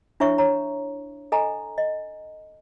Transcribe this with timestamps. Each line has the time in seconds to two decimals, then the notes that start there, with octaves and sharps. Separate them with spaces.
0.20 D4 E4 C#5 E5 C#6
0.38 C#5 A#5
1.32 A4 D#5 G#5 A#5
1.78 D#5